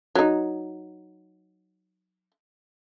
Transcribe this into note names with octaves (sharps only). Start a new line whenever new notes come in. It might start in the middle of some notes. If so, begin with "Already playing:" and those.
F#3 D#4